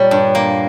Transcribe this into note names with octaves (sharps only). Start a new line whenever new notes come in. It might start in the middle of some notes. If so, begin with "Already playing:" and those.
Already playing: A#2 G3 C#5
G2
A#3